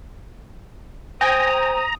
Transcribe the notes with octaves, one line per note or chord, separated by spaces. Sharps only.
C5 G5 G#5 A#5 D#6